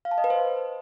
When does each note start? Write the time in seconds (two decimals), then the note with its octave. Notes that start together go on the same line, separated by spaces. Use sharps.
0.05 F5
0.11 A5
0.18 D#5
0.24 B4
0.30 C5